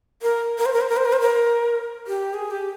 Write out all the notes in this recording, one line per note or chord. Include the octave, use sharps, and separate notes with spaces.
A#4
A#4
C5
A#4
C5
A#4
C5
A#4
C5
A#4
G4
G#4
G4